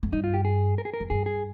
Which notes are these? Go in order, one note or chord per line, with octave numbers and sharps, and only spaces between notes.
F2
G2 D#4
F4
G4
G#4
A#4
G#4
A#4
F2
G2 G#4
G#4